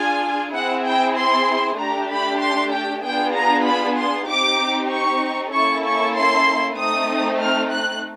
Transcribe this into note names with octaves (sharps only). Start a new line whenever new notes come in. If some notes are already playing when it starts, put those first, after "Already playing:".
Already playing: D4 F4 G#4 G#5
C4 E4 G#4 F#5
G5
C6
A3 D4 G4 A#5
B5
C6
G5
B3 D4 F4 G#4 G5
A#5
B5
C6
C4 D#4 G4 D6
C#6
A#3 C#4 E4 A4 C#6
C#6
C6
A3 C4 D#4 D#6
F6
F#6